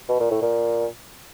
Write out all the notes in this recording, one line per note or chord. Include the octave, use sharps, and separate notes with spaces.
B2
A#2
A2
A#2